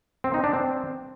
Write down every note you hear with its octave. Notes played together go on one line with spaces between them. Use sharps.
C4
D#4
D4
C4